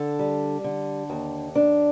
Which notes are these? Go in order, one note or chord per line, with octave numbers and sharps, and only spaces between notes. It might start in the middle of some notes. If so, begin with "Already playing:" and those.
Already playing: D3 A4
G3
D3
D#2
D4